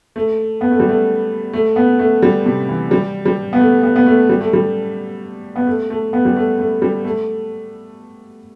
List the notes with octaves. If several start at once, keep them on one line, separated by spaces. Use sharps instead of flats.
A3
B3
A3
G3
A3
A3
B3
A3
G3
C3
E3
G3
G3
B3
A3
B3
B3
A3
G3
A3
G3
B3
A3
A3
B3
G3
A3
A3
G3
A3